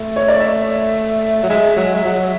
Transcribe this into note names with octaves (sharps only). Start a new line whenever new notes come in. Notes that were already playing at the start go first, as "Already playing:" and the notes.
Already playing: A3
C#5
D5
E5
F#3
G#3 E5
F#3
G#3
F#3